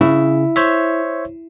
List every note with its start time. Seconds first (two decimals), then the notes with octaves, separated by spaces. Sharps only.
0.01 C#3 E4
0.56 C5 C#5 E5